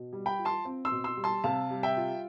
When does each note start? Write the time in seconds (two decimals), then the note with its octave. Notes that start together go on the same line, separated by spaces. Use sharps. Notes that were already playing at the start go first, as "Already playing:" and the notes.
Already playing: B2
0.13 G3
0.26 G5 B5
0.39 F4
0.45 A5 C6
0.65 C4
0.85 C6 E6
0.92 B2
1.04 C6 E6
1.17 G3
1.24 A5 C6
1.44 C3 F5 A5
1.70 G3
1.83 E5 G5
1.97 F4